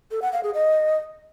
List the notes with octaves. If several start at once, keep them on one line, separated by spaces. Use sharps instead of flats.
A4
F#5
F5
G#4
D#5